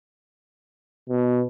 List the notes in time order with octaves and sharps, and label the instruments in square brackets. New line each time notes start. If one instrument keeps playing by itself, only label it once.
[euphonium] B2